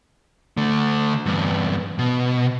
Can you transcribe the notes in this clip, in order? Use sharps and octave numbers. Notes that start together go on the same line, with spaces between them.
D3 A3
E2 G2
B2